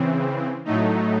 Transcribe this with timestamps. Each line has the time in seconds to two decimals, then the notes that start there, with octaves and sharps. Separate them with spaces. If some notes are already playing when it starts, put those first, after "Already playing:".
Already playing: C#3 E3 C4
0.65 A2 F#3 A3 D#4